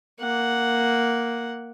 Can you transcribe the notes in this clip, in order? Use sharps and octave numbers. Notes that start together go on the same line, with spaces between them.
A#3 F#5